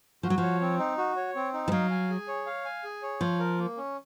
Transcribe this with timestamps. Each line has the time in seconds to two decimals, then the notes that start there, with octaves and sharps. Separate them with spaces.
0.23 F3 F#4
0.30 F#3
0.38 F3 C#5
0.61 C4
0.79 D#4
0.98 F#4
1.16 C#5
1.35 C4
1.54 D#4
1.68 F3
1.72 F#3 F5
1.91 G#5
2.10 G#4
2.28 C#5
2.46 F5
2.65 G#5
2.84 G#4
3.03 C#5
3.21 F3 F4
3.39 A#4
3.59 A#3
3.77 C#4